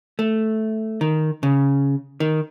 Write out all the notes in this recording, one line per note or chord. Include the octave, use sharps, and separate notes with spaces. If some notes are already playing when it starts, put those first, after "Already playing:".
A3
D#3
C#3
D#3